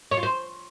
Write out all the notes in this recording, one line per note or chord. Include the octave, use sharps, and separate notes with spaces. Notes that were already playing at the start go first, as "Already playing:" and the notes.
C#5
F4
C5